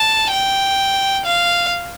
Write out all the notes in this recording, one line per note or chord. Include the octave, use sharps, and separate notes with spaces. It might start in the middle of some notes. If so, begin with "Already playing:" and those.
Already playing: A5
G5
F5